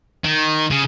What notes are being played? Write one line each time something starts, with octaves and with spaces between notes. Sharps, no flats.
D#3
C#3